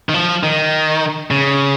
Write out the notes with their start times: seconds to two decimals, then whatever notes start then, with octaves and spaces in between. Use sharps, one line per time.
0.09 D#3
0.14 F3
0.43 D#3
1.31 C#3